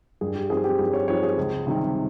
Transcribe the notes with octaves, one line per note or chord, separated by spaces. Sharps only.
G2 G#4
G4
F3 C4 D#4 G#4
G4
G2 G#4
C#5
F3 C4 D#4 C#5
G#4
C#2
C3 D#3 G3